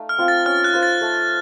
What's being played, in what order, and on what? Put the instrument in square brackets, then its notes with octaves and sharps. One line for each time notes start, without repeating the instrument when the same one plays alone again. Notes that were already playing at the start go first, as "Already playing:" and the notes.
Already playing: [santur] A3 D#4 F5
[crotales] F6
[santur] C4 F4
[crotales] A6
[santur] C#4 [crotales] F6
[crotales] F#6
[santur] F4 C5
[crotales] A6
[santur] A3